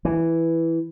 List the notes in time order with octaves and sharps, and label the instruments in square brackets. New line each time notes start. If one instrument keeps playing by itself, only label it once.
[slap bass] E3